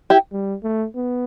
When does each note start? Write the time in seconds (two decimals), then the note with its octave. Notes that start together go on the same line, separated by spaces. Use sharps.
0.10 E4 G4
0.32 G3
0.63 A3
0.96 B3